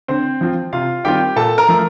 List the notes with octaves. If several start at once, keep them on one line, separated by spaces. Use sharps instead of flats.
D3 C4 C5
F3 C4 F4
C3 F4 F5
D#3 G3 C4 F4 G4 G5
A#2 A4 A5
A#4 A#5
F3 A3